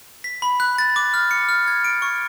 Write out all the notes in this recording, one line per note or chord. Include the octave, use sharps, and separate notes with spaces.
B6
B5
F#6
A6
D6
F6
C#7
F6
G#6
D7
C#6